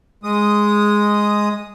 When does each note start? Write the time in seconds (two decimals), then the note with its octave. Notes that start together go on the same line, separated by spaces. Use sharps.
0.23 G#3 D#6